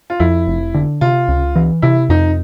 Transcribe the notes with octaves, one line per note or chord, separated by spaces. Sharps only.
F4
F2 E4
F1
D3
C3 F4
C#2
E3
C3 E4
F2 D#4